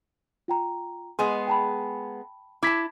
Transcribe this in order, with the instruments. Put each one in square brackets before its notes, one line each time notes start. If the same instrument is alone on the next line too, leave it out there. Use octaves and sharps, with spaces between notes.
[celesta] F4 G5 A#5
[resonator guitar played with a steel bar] G#3 B3 G#4 [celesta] C6
[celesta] G5 A5 B5
[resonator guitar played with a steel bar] E4 A5 [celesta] D6 G#6 B6